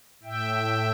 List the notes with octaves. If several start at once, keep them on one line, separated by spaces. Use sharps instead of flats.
A2 E5 G5